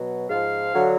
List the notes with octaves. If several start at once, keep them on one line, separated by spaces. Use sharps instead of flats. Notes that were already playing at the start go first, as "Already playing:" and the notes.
Already playing: B2 F#3
G#2 F3 F5
D3 F#3